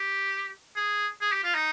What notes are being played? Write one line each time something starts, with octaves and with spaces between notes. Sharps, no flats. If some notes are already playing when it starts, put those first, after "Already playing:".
Already playing: G4
G#4
G#4
G4
F4
D#4